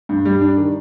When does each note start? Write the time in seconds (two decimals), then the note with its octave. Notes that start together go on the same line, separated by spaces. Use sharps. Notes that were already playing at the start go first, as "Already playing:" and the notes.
0.09 G2
0.25 G3
0.41 D4
0.57 D#3